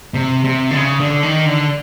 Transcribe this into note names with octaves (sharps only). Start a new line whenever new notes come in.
C3
C3
D3
C#3
D3
D#3
D3